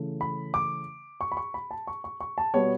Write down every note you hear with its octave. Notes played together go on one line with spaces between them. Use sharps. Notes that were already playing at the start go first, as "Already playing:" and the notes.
Already playing: C#3 E3 A3
B5
D6
C#6
B5
C#6
B5
A5
C#6
C#6
C#6
A5
B2 G3 B3 C#5